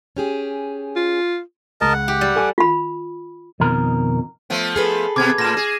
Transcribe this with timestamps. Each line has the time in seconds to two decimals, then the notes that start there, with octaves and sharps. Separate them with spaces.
0.17 C#4 G4 G#4
0.96 F4
1.81 C#2 A#4 D#5 A5
1.93 F#5
2.08 G4
2.21 G3
2.36 A4 G#5 D6
2.58 F4 B5
3.60 F2 B2 D#3 A#4
4.50 F3 A3 B3
4.76 G#4 A4 B4
5.16 B2 B3 D6 G#6
5.38 A2 A#6 E7
5.57 G#4